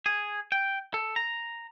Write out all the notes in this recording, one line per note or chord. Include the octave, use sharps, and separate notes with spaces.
G#4
G5
A4
A#5